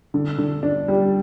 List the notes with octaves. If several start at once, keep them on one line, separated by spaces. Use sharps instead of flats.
D3
D3
D4
G3